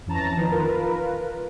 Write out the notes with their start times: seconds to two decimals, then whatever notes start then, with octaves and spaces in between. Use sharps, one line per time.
0.06 F2 E3 C#4 A5 A#5
0.36 D#3 F3 B3
0.52 F4 A#4 B4